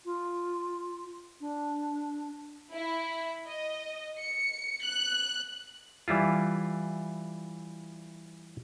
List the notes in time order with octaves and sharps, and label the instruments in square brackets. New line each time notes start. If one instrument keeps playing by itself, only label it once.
[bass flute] F4
D4
[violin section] E4
D#5
C#7
F#6
[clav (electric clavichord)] E3 G3 E4 F4